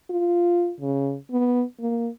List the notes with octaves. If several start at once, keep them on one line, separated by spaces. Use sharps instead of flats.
F4
C#3
B3
A#3